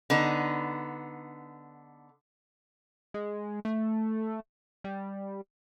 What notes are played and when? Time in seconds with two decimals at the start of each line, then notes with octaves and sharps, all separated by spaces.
0.10 D3 B3 D#4
3.14 G#3
3.65 A3
4.84 G3